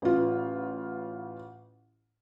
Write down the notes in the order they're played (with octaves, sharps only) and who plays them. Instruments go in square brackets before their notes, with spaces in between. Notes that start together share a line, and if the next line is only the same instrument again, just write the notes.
[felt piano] A1 F4